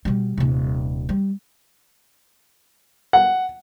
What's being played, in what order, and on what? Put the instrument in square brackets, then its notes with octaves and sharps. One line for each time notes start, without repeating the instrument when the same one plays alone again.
[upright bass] B2 G3
D#1 C3
G3
[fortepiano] F#5